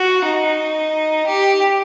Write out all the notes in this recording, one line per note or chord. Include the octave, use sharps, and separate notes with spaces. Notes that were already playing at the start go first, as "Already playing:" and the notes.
Already playing: F#4
D#4
G4